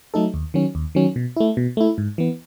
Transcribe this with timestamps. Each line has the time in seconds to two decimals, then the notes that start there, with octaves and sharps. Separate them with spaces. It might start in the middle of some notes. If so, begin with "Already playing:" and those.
0.14 F#3 A3 D#4 A4
0.34 D#2
0.54 D#3 F#3 C#4
0.75 D#2
0.95 D#3 F#3 C#4
1.16 B2
1.36 A3 E4
1.57 B2
1.77 A3 E4
1.98 G#2
2.18 E3 B3